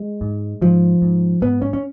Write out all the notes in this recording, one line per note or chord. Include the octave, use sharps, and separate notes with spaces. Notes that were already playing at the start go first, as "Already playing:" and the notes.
Already playing: G#3
G#2
G#2 F3
G#2
G#2 B3
C#4
C#4